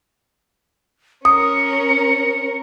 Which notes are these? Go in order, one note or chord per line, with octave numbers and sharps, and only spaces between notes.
C#4 A#4 D#6 C#7